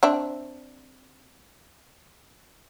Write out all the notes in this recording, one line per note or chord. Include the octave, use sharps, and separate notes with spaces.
C4 D4 E5